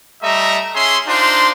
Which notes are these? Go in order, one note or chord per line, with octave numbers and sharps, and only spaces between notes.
G3 A3 D#5 E5 A#5
C#4 G#4 E5 C6
D4 D#4 F4 C5 C6